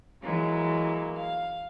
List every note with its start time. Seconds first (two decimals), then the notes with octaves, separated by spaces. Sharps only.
0.23 E3 F#3 G#3 A#3
1.18 F5